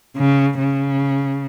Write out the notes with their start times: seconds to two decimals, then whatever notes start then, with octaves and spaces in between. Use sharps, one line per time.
0.17 C#3
0.59 C#3